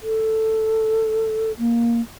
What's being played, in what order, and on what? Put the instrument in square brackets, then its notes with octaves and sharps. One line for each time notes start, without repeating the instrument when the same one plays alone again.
[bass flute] A4
A#3